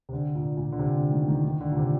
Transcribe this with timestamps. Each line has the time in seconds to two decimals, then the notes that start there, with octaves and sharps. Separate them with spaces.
0.09 C3
0.13 D3
0.35 A#2
0.57 A#2
0.72 D3
0.79 C3
0.95 D3
1.11 D#3
1.28 D#3
1.44 D#3
1.61 D3
1.72 A#2
1.77 C3